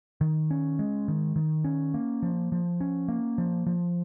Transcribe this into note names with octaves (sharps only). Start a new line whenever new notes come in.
D#3
C#4
G#3
D#3
D#3
C#4
A#3
F3
F3
C#4
A#3
F3
F3